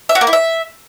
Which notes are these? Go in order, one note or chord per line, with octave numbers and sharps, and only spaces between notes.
E5
F#4
A#3
E4
E5